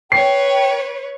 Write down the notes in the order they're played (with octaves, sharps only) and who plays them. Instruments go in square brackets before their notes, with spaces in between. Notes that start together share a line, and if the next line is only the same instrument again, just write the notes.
[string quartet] B4 C#5 [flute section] G5 [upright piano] C7